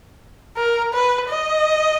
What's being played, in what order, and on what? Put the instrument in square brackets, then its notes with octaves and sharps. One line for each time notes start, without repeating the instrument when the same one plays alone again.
[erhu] A#4
B4
D#5